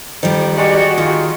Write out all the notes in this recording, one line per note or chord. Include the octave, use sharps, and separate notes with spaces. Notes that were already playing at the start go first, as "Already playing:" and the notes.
F2 D#3 G3 G5
G#3 F#4 G4 D5
D#3 F4